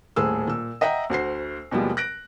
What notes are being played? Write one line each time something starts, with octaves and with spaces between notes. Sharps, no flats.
D#1 A2 G#4 C5 E6
A#2 E6
D#5 E5 F#5 G5 A#5
D2 F#4 C5 C7
D#2 B2 F3 G3 G#3
F#6 A#6 D7